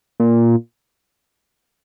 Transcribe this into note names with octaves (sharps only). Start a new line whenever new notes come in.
A#2